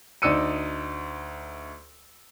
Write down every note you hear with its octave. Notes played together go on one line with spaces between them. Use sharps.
D2 D#4 D5 E6 C#7 D#7